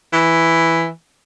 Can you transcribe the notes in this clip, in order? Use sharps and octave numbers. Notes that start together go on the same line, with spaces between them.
E3